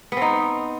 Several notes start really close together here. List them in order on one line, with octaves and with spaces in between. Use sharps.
B3 C4 D#4